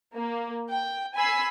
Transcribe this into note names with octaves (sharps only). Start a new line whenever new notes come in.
A#3
G5
G#5 B5 E6 C7